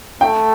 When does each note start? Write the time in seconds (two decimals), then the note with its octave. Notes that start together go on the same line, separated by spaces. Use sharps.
0.21 A3 G5